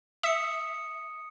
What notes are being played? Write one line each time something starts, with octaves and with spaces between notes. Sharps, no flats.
E5 D#6 C#7